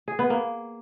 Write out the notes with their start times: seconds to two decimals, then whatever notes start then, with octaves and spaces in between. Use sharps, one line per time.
0.08 G#4
0.19 B3
0.30 A#3